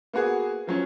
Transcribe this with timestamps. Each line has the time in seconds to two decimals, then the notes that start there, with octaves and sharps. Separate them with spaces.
0.13 A#3 B3 F#4 G#4
0.67 F3 F#3 C#4